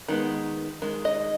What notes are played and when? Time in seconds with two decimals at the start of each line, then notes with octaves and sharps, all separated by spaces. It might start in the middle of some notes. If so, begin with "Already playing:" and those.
0.08 D#3 G#3 B3
0.82 D#3 G#3
1.05 D#5